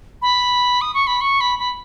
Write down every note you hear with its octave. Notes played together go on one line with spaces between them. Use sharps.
B5
D#6
C#6
B5
C#6
B5
B5